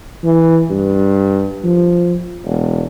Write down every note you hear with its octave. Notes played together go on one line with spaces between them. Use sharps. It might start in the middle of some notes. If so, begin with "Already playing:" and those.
E3
G2
F3
E1